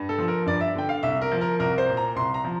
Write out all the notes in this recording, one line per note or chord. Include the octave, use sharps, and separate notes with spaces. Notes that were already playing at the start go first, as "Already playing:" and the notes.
Already playing: G2
A4
F3
A#4
G2 D5
E5
D3 G5
F5
C2 E5
A#4
F3
A#4
C2 A#4
C5
A#2
A#5
C2 C6
A#5
F3